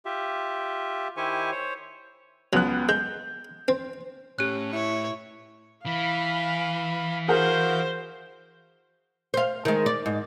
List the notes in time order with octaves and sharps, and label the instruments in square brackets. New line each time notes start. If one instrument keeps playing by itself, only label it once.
[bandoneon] F4 G4 E5
D#3 E4 G4 C5 G#5 C#6
C5 C#5
[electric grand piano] C#2 B3 F#6 [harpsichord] F#3
[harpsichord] G#3 [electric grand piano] G6
[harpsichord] C4
[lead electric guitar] A2 [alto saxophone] C#4 [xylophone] G4 F#6
[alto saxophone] E4 [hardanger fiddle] C#5
[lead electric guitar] E3 [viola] F5 [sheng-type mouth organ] B5
[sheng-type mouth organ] F#4 F5 G6 [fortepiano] G#4 A#4 F#5 [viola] C5
[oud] C5 F5
D#3 G#3
D5
G#2